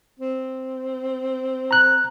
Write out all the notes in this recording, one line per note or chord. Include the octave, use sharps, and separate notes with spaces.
C4
A#5 F#6